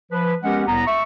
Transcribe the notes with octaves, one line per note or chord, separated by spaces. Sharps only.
F3 B4
G#3 B3 C#4 G4 A#4 F#5
C2 A2 B3 A#5
E5 C#6